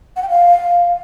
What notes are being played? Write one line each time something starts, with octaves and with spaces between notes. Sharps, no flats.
F#5
G5
F5